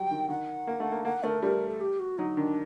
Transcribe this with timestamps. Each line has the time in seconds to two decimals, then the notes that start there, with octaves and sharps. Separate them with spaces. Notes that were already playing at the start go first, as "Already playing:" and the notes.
Already playing: F#3 G3 G5
0.11 D#3
0.29 D#3 F#5
0.67 A#3
0.80 A3
0.92 A#3
1.05 A#3 F#5
1.24 A3 A#4
1.42 G3 A#4
1.69 A4
1.81 G4
2.00 F#4
2.18 F#3 D#4
2.37 D#3 D4